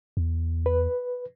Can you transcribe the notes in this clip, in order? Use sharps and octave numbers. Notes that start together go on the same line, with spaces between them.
E2
B4